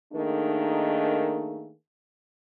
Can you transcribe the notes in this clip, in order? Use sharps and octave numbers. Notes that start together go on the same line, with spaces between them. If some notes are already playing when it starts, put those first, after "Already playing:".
D#3 A3 A#3 D4 D#4 G#4